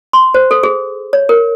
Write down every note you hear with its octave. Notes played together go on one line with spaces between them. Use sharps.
C6
C5
A4
G#4
C#5
A#4